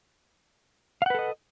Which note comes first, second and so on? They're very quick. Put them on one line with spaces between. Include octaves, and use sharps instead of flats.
F5 F#5 B4 A4 D#5